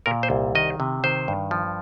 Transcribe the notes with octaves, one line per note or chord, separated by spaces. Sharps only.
A#2 A#4
C5
C2
D#3 D#5
C3
D#3 C5
G2
F3